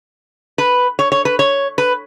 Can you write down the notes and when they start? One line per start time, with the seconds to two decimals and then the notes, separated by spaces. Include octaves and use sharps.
0.58 B4
0.99 C#5
1.12 C#5
1.25 B4
1.39 C#5
1.78 B4